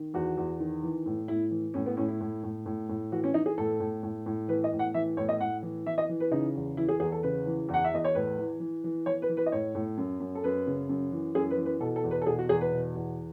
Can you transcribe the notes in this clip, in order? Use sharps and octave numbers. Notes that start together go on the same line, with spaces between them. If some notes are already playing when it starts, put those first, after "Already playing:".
Already playing: D#3
E2 F#4
E2
D#3
E3
A2
A2 E4
E3
A2 C#4
B3
A2 C#4
E4
A2
A2
A2
A2
E3 F#4
C#4
E3 D#4
G#4
A2 A4
A2
A2
A2
E3 B4
D#5
A2
F#5
E3 E5
A2 C#5
D#5
A2 F#5
E3
E3 E5
D#5
E3
B4
C#3 D#4
E2
E3 E4
G#4
E2 G#4
A4
C#3 B4
E3
E2
F#5
E5
E2 D#5
C#5
A2 B4
E3
E3
E3
E3 C#5
B4
E3
B4
D#5
A2 C#5
A2
F#2
F#2
A4
F#2 B4
C#3
F#2
E3
F#2 G#4
B4
E3
B4
B2 A4
A4
E2
B4
A4
B2 G#4
F#4
E2 G#4
B4
B2
E2